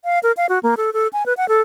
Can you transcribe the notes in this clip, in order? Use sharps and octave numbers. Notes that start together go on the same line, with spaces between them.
F5
A#4
F5
F#4
A#3
A4
A4
G#5
B4
F#5
A4